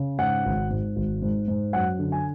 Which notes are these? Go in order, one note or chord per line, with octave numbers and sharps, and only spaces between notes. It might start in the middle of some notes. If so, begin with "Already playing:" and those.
Already playing: C#3
G#2 F#5
G#1
G#2
G#1
G#2
G#2
F#2 F#5
D3
G#5